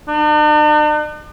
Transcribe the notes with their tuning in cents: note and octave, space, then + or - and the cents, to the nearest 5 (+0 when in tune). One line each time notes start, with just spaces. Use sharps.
D4 +45